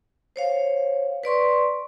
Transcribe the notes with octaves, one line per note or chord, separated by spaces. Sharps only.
C5 C#5 F5
B4 D5 C6 C#6